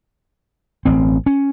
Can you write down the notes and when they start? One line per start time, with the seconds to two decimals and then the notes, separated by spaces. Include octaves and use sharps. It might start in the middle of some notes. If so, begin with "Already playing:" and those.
0.85 A1 C4
1.26 C#4